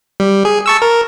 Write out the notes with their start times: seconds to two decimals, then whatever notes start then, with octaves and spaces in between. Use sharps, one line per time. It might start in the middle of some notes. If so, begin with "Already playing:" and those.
0.20 G3
0.45 G#4
0.66 A5 C#6 E6
0.82 A#4